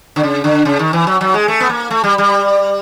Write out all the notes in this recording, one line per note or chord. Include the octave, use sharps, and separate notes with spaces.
D3
C#3
D3
C#3
D#3
E3
F#3
F#3
G#3
A3
B3
A#3
A3
G3
G3